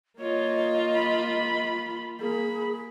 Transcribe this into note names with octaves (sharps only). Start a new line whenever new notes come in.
A#3 F4 C#5 D#5
B5
A#3 G#4 B5